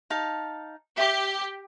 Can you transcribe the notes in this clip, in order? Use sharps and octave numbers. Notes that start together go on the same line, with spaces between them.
D#4 F5 A5
G4 E5 D6